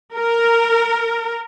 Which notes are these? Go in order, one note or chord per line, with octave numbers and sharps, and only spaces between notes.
A#4